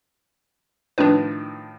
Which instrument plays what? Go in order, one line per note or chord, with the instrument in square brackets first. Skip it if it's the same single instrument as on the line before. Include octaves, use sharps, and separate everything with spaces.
[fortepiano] A2 D#3 F3 [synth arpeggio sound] D4 B4